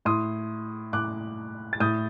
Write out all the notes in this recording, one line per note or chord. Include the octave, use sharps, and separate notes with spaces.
A2 C6 D#6
A2 D6 F#6
A6
A2 D#6 G6